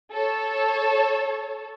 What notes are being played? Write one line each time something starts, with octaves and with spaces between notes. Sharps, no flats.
A4 C#5